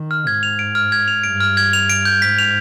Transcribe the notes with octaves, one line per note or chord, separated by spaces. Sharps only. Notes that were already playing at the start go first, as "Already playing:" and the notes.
Already playing: D#3
F6
G#2 G#6
F7
D7
F6
G#6
F7
G2 D7
F6
G#6
F7
D7
G6
G#2 B6
F7